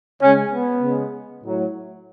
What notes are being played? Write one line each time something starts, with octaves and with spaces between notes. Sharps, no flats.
C#3 G#3 C#4
B3
C#3 G#3
A2 F#3